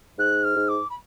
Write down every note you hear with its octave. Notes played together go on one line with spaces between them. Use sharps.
G#2 F#6
F6
G#2
D6
B5